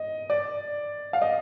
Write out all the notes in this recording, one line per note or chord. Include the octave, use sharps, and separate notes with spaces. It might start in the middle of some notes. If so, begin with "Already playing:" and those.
Already playing: D#5
D5
F5
D#5